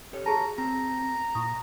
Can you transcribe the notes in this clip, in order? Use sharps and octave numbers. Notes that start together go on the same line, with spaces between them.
G4 A4 C#5
F#4 G#4 A5 A#5
C4 A#5
A#2 E4 C#6 D#6